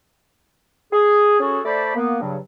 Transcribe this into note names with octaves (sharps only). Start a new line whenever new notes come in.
G#4
C#4 F#4 G#4 A4
A3 C5 D5 B5
A#3 B3
G2 C#3 F#3